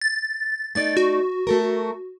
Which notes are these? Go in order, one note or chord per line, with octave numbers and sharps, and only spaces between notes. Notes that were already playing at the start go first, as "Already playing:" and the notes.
A6
A3 D#4 D5 A6
F#4
A3 A4 A#4